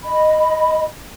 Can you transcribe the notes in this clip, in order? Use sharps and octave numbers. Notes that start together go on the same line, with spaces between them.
D#5 B5